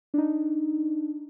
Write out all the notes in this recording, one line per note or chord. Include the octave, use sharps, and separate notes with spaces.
D4 D#4